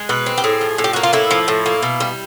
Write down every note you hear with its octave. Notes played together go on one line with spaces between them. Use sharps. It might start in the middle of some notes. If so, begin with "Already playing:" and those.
Already playing: G#3
B2 B4
C4
G4
A2 G#4
F3
A2
G4
A#3 F#4
F4
A2 E4
F3
A2
A#3
B2
G3